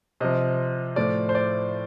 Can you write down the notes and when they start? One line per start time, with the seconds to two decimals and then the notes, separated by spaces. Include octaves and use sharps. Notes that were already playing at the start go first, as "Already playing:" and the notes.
0.20 C3 F3 D#5
0.96 A2 F3 D5
1.29 C5
1.35 D5